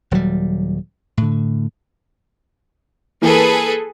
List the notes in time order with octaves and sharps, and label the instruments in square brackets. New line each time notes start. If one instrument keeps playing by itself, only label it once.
[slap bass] D#1 F#3 G3
A2 D3
[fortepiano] E3 A#3 [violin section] G#4 A4 B4